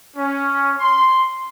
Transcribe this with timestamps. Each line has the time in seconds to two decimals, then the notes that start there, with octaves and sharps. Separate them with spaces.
0.17 C#4
0.78 C6